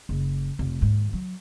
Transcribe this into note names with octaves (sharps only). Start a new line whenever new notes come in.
F#1
F1
D#2 G#2
F#3